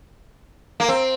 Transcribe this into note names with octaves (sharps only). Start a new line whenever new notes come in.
A#3
C4